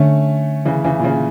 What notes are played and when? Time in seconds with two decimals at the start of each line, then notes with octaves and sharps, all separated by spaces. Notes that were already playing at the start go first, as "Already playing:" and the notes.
Already playing: D3 A3 C#4
0.65 C#3 E3
0.84 C#3 E3
1.00 A#2
1.04 C#3